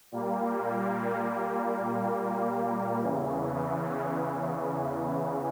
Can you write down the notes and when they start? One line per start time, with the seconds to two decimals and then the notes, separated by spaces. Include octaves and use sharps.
0.12 A#2 G3 A#3
3.02 E2 C#3 E3